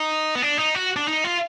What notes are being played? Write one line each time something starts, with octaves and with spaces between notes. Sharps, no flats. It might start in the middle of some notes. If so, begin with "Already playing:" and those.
Already playing: D#4
B3
D4
D#4
F#4
D4
D#4
F4